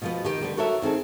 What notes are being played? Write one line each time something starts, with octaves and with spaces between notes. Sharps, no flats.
B2 F3 B3
D#3 D#4 G4
D3 G3 B3
F#4 A4 A#4 C#5 E5
D#3 C4 G#4 A4